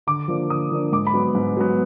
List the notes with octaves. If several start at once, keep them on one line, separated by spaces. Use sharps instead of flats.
D3 D6
F3 A#3 D4
D3 D#6
F3 A#3 D4
G#2 D6
B5
F#3 B3
G#2
F#3 B3